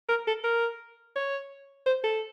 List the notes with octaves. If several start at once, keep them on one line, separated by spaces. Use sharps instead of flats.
A#4
A4
A#4
C#5
C5
A4